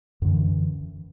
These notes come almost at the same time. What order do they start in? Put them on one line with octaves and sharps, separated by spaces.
F#2 D3 E3